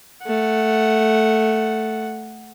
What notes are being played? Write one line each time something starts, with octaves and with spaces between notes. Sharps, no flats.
A3 F#5